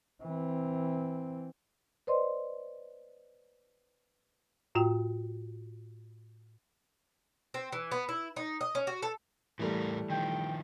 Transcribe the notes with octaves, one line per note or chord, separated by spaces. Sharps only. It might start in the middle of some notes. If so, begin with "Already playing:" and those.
E3 C4
B4 C5 D5 D#5 C6
A2 F4 F#4 G5
C4
E3
B3
E4
D#4
D#5
C#4
F#4
A4
A2 E3 G3 A3 A#4
D#3 F3 G5